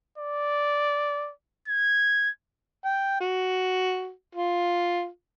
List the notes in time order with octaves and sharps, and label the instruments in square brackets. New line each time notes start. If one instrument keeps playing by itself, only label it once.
[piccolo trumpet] D5
G#6
[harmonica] G5
F#4
F4